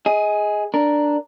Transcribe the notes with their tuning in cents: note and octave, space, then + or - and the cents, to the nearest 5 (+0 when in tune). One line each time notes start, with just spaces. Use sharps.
G#4 +0 D#5 +25
D4 +5 A#4 +0